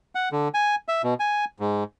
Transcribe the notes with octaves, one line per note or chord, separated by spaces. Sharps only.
F#5
D3
G#5
E5
B2
G#5
G#2